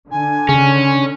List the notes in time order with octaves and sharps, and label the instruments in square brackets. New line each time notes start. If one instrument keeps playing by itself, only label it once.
[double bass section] D3 [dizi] G#5
[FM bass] C#3 [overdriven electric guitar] C#4